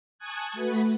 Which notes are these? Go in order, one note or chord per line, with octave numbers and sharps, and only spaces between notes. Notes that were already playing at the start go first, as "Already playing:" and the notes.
G#5 A5 C#6 D#6 F#6 G#6
A3 F#4 B4